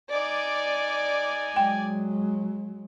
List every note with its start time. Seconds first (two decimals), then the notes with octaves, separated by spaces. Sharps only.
0.13 D#4 D5 G#5
1.56 F#3 G#3 G5